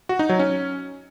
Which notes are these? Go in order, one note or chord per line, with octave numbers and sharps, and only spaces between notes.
F#4
D#4
F#3
C#4